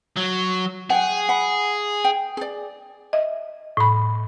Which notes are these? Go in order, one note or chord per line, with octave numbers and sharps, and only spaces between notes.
F#3
G#4 F#5 G5
F#5 B5
G5
G#4 D5
D#5 E5
A2 B5